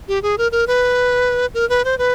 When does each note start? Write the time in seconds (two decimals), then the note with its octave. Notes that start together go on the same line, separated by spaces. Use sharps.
0.08 G4
0.23 G#4
0.38 A#4
0.52 A#4
0.67 B4
1.54 A#4
1.69 B4
1.85 C5
1.98 B4